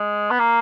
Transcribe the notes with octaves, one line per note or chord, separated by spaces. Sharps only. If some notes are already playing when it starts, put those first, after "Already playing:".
Already playing: G#3
B3
A#3